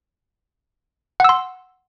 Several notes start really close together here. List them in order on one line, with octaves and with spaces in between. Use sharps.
F#5 E6 C6